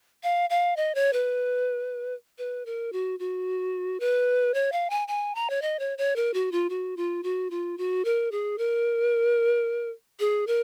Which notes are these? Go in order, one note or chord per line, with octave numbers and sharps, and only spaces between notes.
F5
F5
D#5
C#5
B4
B4
A#4
F#4
F#4
B4
C#5
F5
G#5
G#5
A#5
C#5
D#5
C#5
C#5
A#4
F#4
F4
F#4
F4
F#4
F4
F#4
A#4
G#4
A#4
G#4
A#4